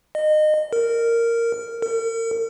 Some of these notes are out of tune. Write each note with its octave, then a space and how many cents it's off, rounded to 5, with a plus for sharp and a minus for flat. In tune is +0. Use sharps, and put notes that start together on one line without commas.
D#5 -25
A#4 -10
A#4 -40